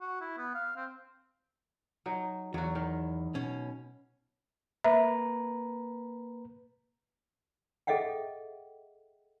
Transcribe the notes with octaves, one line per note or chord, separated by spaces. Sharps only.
F#4
E4
B3
F5
C4
F#3 D#4
E2 F#3 F#4
D#3
B2 C#4
A#3 B4 E5 A#5
G#4 A4 D#5 E5 F#5 G5